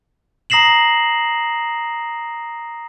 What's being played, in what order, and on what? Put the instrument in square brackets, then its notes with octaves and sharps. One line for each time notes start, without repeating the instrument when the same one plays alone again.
[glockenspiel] A#5 D#6 A#6 C7 E7 F#7